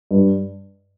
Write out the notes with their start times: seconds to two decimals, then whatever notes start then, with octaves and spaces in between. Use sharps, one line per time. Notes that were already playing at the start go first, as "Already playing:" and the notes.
0.11 G2